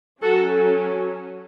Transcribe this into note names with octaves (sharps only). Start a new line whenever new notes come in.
F#3 C#4 F#4 A4